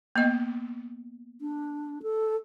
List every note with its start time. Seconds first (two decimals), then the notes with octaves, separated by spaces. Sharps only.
0.16 A#3 B3 D#5
1.41 D4
2.03 A4